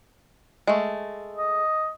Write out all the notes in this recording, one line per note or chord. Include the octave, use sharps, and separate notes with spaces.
G#3 A3
D#5